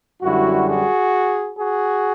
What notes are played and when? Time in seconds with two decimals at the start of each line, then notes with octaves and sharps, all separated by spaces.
0.22 F#2 D3 G3 E4 F#4
0.68 F#4 G#4
1.59 F#4 G#4